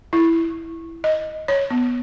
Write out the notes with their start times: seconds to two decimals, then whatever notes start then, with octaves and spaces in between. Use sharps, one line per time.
0.13 E4
1.04 D#5
1.48 C#5
1.70 B3